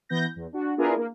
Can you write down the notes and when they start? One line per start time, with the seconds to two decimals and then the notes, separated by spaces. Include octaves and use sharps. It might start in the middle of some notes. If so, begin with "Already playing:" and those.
0.09 E3 B3 G6 A#6
0.36 E2
0.53 D4 F#4
0.77 B3 D4 E4 F4 G#4 A#4
0.96 A#3